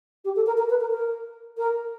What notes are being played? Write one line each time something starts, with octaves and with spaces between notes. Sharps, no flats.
G4
A4
A#4
A#4
B4
A#4
A#4
A#4